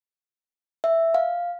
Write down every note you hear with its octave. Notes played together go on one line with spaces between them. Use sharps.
E5
F5